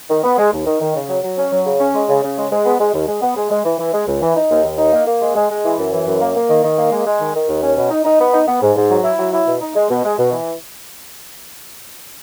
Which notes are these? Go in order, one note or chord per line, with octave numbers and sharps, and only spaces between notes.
D#3
B3
G#3
D#2
D#3
D#3
C#3
F#3
F#3
C#4
F#3
C#3
C#4
G#3
C#3
C#3
G#3
G#3
B3
G#3
D#2
G#3
B3
G#3
G#3
E3
E3
G#3
C#2
E3
D#4
D#2
D#2
D#4
A#3
A#3
G#3
G#3
G#3
E3
F#2
E3
F#2
A#3
A#3
D#3
D#3
A#3
G#3
G#3
D#3
D#3
D#2
C#4
B2
D#4
D#4
B3
D#4
B3
G#2
G#2
F#3
E4
F#3
E4
B2
D#4
G#3
B2
G#3
B2
E3